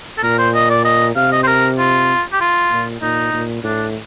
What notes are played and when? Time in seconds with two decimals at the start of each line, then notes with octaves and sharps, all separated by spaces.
0.18 A4
0.23 A#2 A#4
0.38 C5
0.55 D#5
0.70 D5
0.85 D#5
1.16 C3 F5
1.32 D#5
1.43 C5
1.47 A#4
1.79 F4
2.33 G4
2.41 F4
2.71 A#2
3.02 A#2 D#4
3.33 A#2
3.64 A2 D4